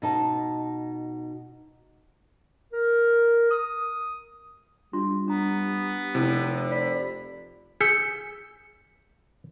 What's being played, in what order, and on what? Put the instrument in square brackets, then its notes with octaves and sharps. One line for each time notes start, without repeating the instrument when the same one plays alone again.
[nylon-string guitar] B2 D#4 A5
[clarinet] A#4
D#6
[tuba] G3 [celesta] D4 F4 C6
[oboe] B3 [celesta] D4 A#5
[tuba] F1 [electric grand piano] C3 [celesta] E4
[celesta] D5 [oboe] B5
[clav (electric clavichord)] G#4 [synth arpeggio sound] E6 G6 B6 [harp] C#7